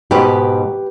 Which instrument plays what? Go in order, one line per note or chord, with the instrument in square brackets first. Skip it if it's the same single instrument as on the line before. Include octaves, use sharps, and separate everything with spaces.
[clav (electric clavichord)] G#2 B2 [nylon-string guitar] G4 B4